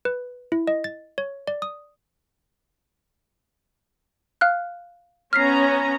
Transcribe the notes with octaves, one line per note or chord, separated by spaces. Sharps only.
B4
E4
D#5
A6
C#5
D5
D#6
F5 F6 F#6
B3 C#4 A#5 F6 B6 C7